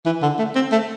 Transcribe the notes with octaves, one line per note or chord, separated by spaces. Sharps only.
E3
D3
A3
C4
A3